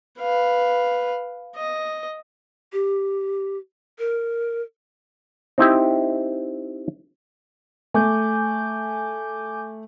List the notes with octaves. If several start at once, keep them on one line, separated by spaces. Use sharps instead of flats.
B4 F5
D#5
G4
A#4
C4 D#4 E4 G4
A3 G#5 D6 G6